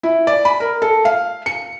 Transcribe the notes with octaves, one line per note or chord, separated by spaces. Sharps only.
E4
D5
B5
A#4
A4
F5
C#7